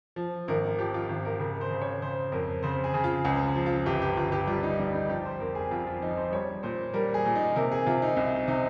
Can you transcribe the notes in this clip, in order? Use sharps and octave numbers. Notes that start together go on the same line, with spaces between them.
F3
G#1 A#4
F3 G4
F4
G#1
A#4
C#3 A#4
C5
C#3
C#5
C#3 C5
F2 A#4
C#3 C5
G#4
C#3
F4
C#2 C#4
F3
F4
G1 G4
G4
G1 F4
G4
G3 F4
D#4
G3 D#4
D#4
F3 G4
C5
F2 A#4
G#4
F2 F4
F4
F3 D#4
C5
G3 C#5
A#2 C5
G3 A#4
G#4
A#2
D#4
C3 A#4
G#4
C3 F4
D#4
C2
C3 D#4